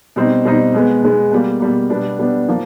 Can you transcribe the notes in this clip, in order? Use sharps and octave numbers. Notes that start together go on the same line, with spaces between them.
B2 G3 C4 D#4
B2 G3 C4 D#4
B2 G#3 B3
B2 G#3 B3
B2 G3 A#3
B2 G3 A#3
B2 G3 B3 D4
B2 G3 B3 D4
F3 A#3